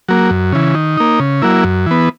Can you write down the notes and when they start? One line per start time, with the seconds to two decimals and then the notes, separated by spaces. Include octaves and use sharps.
0.09 F#3 A#3
0.31 F#2
0.52 C#3 E3
0.75 D#3
0.97 A#3 D#4
1.20 C#3
1.42 F#3 A#3 E4
1.64 F#2
1.86 E3 B3